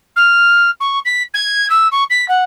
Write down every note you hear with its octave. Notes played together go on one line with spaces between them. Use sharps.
F6
C#6
B6
G#6
E6
C#6
B6
F#5